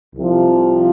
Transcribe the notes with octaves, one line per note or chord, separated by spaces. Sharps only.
C2 C3 F3